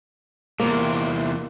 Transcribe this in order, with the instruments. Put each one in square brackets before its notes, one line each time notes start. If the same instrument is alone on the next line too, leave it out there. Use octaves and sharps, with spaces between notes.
[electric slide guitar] E2 C3 [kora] A#3